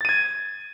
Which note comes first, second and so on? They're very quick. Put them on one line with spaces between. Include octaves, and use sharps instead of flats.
A6 D#7 G#6